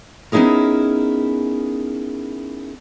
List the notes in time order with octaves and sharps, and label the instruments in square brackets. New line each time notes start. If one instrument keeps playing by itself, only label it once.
[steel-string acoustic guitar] B3 C#4 D#4 E4 G#4 A#4